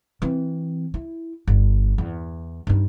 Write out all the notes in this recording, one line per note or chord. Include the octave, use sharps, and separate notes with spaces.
E3 C4
E4
G1
E2
G2 D#4